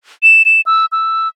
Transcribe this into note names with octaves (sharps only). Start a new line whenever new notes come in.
E7
E7
E6
E6